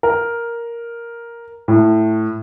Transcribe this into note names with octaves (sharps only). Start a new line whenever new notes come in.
A#4
A2